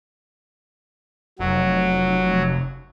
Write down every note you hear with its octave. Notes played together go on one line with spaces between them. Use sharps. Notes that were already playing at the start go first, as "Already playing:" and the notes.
F1 F#3